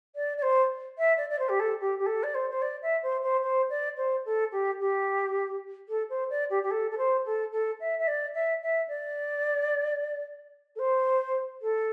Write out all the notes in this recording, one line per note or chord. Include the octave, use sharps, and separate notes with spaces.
D5
D5
C5
E5
D5
D5
C5
G4
A4
G4
G4
A4
D5
C5
C5
D5
E5
C5
C5
C5
D5
C5
A4
G4
G4
A4
C5
D5
G4
G4
A4
A4
C5
A4
A4
E5
E5
D5
E5
E5
D5
A4
C5
A4